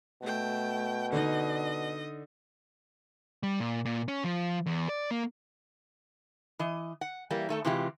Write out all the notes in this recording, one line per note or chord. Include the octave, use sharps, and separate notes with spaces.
B2 A3 G5
D3 D4 D#4 D#5
G3
A#2
A#2
C#4
F3
E2
D5
A#3
E3 D#5
F#5
E3 G3 A#3
D#3 A3 A4
C3 E3 G#3 F4 G4